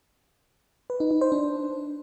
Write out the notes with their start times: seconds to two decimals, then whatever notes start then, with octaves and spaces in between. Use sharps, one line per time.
0.90 B4
1.00 D#4
1.11 D#4
1.21 C5
1.32 D4